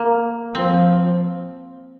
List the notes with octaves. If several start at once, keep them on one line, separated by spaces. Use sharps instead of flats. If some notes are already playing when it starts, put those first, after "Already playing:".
Already playing: A#3
F3 C4